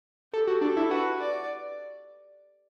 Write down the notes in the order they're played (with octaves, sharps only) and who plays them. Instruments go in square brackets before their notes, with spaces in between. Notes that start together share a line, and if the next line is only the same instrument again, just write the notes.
[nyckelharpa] G4 [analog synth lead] A4
[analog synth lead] F#4
[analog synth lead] D4 [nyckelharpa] A4
[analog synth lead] E4
[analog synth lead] F#4 [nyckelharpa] B4
[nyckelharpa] D5